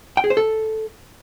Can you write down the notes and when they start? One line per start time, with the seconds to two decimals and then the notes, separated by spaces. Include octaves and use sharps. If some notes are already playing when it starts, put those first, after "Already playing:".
0.17 G5
0.24 G#4
0.30 C5
0.37 A4